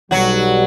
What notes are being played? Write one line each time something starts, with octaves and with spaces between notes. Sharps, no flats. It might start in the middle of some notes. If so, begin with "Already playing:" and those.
B1 B2 F#3 G3 F#4